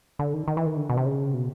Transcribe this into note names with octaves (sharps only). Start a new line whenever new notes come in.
D3
D#3
D#3
E3
D#3
D3
B2
C3
C#3
B2